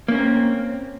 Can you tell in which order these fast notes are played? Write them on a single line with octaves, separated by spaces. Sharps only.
A#3 C#4 A#4 C4